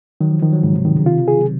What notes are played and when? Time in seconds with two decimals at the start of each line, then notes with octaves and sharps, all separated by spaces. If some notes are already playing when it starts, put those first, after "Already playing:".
0.21 D#3 F#3
0.31 F3
0.42 D#3 F3
0.53 F#3
0.63 G#2 C#3
0.74 C3
0.85 C3 D#3
0.96 C#3
1.06 C3 F4
1.17 C#3
1.28 D#3 G#4
1.38 F#3